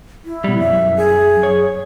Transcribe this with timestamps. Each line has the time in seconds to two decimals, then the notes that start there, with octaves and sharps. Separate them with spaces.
0.25 E4
0.44 B2 G3
0.59 F#2 E5
0.97 G#4
1.43 C#5